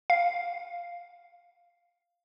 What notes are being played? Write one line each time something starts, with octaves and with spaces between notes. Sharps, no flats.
F5